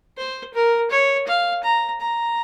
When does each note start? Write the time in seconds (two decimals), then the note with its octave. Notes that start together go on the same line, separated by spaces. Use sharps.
0.17 C5
0.54 A#4
0.91 C#5
1.27 F5
1.63 A#5
2.00 A#5